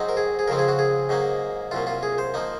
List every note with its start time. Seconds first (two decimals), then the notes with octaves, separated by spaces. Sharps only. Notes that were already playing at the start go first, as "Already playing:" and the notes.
Already playing: G#2 F#3 C4 D#4
0.09 A#4
0.17 G#4
0.39 G#4
0.48 F2 C#3 F3 C4 A#4
0.59 G#4
0.68 F#4
0.79 G#4
1.09 G#2 F#3 A#3 D#4
1.71 C2 A#2 F#3 F4
1.87 F4
2.03 G#4
2.18 C5
2.34 F3 A#3 D#4